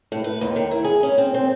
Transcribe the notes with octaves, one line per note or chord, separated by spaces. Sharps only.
A2
B4
D#2
D#3
E4
G#4
C#4
C4
C4